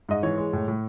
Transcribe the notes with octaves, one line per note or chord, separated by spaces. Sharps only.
G#2 D#5
E3 C#5
G#3
A2
A2